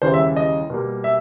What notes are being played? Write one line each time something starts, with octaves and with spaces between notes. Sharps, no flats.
D#2 C#3 E3 G3 C5
E5
D#5
B2 G3 A#3
E5